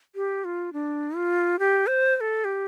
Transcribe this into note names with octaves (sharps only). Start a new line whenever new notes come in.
G4
F4
D4
F4
G4
C5
C5
A4
G4